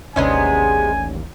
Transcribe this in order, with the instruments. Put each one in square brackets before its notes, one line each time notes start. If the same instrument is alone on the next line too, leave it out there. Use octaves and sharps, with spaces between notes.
[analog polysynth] A1 D#2 [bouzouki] C3 G#3 B3 [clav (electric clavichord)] C#4 D4 [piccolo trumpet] G#5